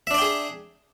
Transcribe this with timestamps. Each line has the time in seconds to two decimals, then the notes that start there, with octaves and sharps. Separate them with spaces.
0.07 E5
0.11 D4
0.14 D5
0.18 G5
0.22 G#4